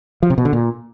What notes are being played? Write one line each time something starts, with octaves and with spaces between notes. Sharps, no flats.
F3
C3
B2
D3
A#2